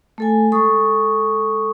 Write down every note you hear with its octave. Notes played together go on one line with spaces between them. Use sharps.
A3 A4 G#5
G#3 A4 C#6 D#6